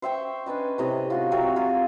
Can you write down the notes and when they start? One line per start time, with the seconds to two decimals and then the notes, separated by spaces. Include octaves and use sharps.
0.02 C5 E5 G5 C#6
0.46 C#4 D4 B4 D#5
0.78 A2 C3 D#5
1.10 F4 F#4 C6
1.32 F#3 C4 A#4 E5
1.56 F4 G#4 A#4